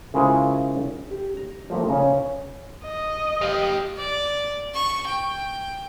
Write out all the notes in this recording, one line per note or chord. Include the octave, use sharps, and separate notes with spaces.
C#3 G#3 E4 F4 A#4 C5
G4
A#5
F3 A3 A#3
C#3 C#4
D#5
G4 F5
D5
C#6
G5